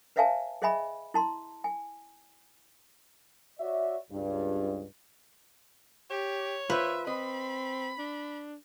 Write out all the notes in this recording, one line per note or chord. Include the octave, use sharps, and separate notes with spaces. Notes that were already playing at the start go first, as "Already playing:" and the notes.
B4 C#5 E5 F5 G#5 A5
G#4 C5 D#5 E5 G#5 B5
E4 A5 C6
G#5
F#4 C#5 D5 E5
C#2 G2
G4 C#5
F4 B4 C5 E5
C4 D#5 B5
D4